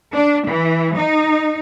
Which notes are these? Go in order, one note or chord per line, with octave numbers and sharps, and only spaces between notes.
D4
E3
D#4